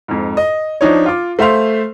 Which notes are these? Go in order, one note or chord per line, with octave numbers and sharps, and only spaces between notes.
F2 G#2
D#5
F3 D4 D#4 C#5
F4 D6
A3 C5 E5 F5 C6 F7